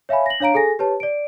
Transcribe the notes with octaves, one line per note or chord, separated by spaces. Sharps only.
C#5 E5 F5 G#5 B5
A#6 F#7
D4 C#5 F5 A#5 D7
G#4 A4 G#5 A#6
G4 B4 C#5 A5
D5 D7